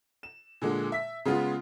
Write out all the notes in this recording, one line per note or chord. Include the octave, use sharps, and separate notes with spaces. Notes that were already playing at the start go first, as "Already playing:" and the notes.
E7
A#2 D3 G#3
E5 B6
C#3 G#3 B3 F4